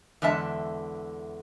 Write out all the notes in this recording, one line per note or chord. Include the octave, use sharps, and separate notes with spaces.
E2 D3 G#3 E5 A5